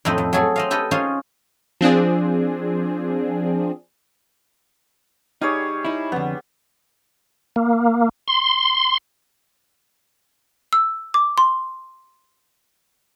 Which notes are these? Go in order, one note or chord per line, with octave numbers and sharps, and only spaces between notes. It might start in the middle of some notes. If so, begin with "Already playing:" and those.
F2 A2 A3 C4 D#4 D#5
F2
F#3 A3 G#4 A4
C4 D#5 F5
E4 G4 A4 B4 D#5
C#4 D#4 F4 G#4 C5 C#5
F3 C4 D4 G#4
G3 D#4 G#4 C#5
D#4 E4
F2 D3 B3
A#3
C6
E6
D6
C6